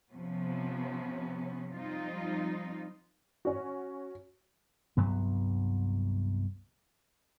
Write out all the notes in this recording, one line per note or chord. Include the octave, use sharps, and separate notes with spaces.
C3 F3 B3 C#4
F3 G3 C4 D#4 F4
C#4 F#4
C2 G2 F#3 B3